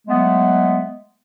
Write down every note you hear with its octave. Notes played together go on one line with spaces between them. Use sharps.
F#3 G#3 A3 B3